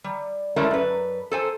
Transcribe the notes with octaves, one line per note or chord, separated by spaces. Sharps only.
G3
G#3 A3 C#4 E4 A#4
F#2 B4
A4 C5 G#5